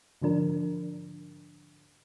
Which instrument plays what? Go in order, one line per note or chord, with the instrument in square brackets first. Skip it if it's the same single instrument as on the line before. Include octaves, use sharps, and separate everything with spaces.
[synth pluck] G#2 D3 F3 D4 A#4